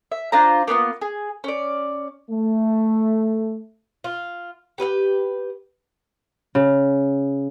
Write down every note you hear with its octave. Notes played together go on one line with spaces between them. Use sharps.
E5
D4 F4 C5 A#5
A#3 B3 D#4 F4
G#4
C#4 D5
A3
F4
G4 B4 E5 G5
C#3